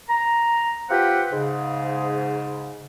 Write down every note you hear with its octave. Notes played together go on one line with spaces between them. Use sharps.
A#5
C4 F4 G4 B4 F#5 G5
G#2 C#3